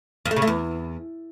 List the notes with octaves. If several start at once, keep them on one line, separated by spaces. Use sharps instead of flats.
F2
A3
C#3
A3
E2